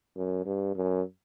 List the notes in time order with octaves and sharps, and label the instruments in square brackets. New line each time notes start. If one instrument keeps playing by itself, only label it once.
[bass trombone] F#2
G2
F#2